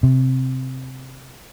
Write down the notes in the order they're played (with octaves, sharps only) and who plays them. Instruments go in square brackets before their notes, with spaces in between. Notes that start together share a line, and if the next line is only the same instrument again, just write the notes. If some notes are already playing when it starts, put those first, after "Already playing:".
[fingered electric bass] C3